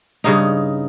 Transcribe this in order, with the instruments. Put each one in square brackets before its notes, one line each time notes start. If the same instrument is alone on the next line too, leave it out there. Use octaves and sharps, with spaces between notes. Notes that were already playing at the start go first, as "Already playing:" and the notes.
[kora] G2 C#3 D#4